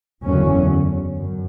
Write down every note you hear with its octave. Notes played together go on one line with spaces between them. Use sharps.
F#1 E2 D3 F#3 C#4
F#2